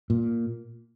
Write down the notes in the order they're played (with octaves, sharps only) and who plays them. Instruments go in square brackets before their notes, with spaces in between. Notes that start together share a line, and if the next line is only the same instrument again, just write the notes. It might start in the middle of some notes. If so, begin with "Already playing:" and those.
[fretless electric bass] A#2